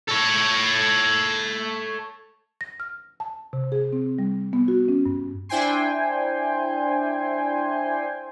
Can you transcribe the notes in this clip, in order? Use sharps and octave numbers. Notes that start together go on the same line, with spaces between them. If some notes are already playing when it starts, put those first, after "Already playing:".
A4 C#5
A#6
F6
A5
C3
G#4
C4
G3
B3
F#4
C#4
G2
D4 E4 C5 G5 G#5 C6